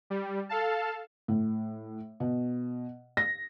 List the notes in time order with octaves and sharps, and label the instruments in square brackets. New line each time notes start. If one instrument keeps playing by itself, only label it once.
[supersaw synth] G3
A4 F5 A5
[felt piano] A2
B2
A#6